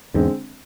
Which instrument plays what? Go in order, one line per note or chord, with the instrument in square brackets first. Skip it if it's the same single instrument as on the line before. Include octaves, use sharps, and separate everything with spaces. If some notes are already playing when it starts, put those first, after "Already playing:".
[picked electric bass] E2 G#2 [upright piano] D3 G#3 C4